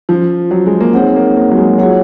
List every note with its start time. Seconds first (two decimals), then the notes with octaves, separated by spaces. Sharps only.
0.09 F3 C#4 F4 C5
0.51 F#3
0.66 G#3
0.80 A#3
0.93 C4 D#4 G#4 C#5 F#5
1.16 A#3
1.36 A#3
1.51 F#3
1.57 G#3
1.78 F#3 F4 G#4 C#5 F#5